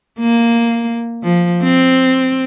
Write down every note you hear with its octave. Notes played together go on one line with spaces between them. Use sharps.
A#3
F3
C4